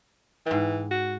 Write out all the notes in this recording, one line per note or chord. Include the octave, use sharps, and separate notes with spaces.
G#2 E3 G5
F#4